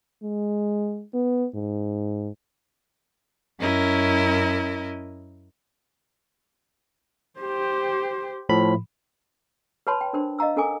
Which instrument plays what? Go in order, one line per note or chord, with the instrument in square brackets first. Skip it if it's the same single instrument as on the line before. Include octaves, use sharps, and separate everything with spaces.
[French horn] G#3
B3
G#2
[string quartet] F#2 C#4 E4 A#4 D#5
[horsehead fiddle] G4 C5
[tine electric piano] A2 F3 B5
[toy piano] B4 C#5 A5 B5 C6
G5
D4 A#4 C5
D#5 F5 A#5 E6
C#4 A4 A#4 G#5 D6